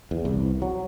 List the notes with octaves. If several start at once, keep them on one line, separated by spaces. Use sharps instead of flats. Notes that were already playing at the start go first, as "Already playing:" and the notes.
E2
C2
F#3